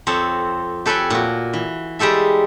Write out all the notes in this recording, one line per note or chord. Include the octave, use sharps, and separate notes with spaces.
F2 C4 A4 C#5
G4 A4 B4 C#5 G5 G#5
A#2 F#4
E3
G3 G#3 G4 A4 E5